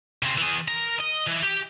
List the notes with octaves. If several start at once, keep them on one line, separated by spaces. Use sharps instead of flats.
C#3 C4
E3 G#4
A#4 A#5
D#5
E3
G4